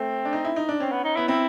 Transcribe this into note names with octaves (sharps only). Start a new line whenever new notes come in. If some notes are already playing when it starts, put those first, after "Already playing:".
Already playing: A3 C4
D4
D#4
E4
D#4
D4
C4 C#4
B3
D#4
B3 E4
C4 E4